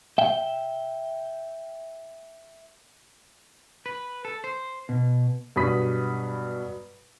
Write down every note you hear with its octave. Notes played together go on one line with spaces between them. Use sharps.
E5 G5
B4
A4
C5
B2
G2 B2 F#3 B5 D#6 B6